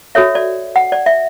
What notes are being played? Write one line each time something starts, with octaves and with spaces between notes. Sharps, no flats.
F#4 A4 C#5 E5
D5
F#5
D5
E5